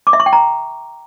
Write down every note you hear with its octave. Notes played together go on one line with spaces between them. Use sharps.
D6
E5
C#6
G5
A#5